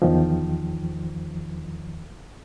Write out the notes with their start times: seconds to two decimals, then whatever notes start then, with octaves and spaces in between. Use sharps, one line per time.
0.02 E2 D#3 F3